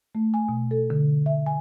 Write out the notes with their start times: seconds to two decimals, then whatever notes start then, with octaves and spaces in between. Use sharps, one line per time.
0.15 A3
0.34 G#5
0.49 B2
0.71 A4
0.90 D3
1.26 E5
1.46 G#5